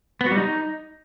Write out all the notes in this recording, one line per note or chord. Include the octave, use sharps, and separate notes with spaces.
B3
F#4
G3
D#4